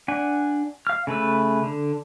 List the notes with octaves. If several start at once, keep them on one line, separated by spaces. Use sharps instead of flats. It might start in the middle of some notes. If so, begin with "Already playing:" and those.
D4 F#5 G#5
F5 F6
C#3 A3 B4 E6
D3